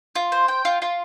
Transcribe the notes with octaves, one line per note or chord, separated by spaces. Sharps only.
F4
C5
G5
F4
F4